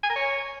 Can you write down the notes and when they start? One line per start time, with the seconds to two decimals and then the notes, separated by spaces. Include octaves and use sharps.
0.03 G#5
0.10 A#4
0.16 C#5